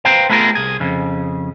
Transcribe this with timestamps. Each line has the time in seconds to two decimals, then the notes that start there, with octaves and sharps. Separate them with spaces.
0.05 B4 C5 F5 G5 A#5
0.29 A3 B3 F4 G#4 A#4
0.55 C2 G#4
0.80 F2 C#3